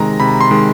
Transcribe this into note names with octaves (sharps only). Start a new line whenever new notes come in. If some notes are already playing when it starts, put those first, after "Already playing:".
Already playing: C3 D#3 G#3 A#5
C3 B5
C6
D#3 G#3